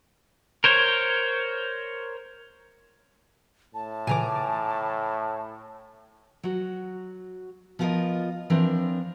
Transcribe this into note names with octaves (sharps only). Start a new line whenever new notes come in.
A#4 C5 C#5
A2 A5
A#2 C#3 E3 G#5 A#5 D6
F#3 F#4
F3 B3 F4 G#4 A#4 D#5
E3 F3 C4 D4 A#4